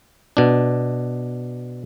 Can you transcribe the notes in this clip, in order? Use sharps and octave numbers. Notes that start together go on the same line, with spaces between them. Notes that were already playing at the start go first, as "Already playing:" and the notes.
B2 D4